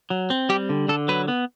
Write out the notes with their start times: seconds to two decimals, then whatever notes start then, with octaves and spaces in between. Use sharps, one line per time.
0.10 F#3
0.30 C4
0.49 G3 G4
0.69 D3
0.89 D3 A4
1.08 F#3 B4
1.28 B3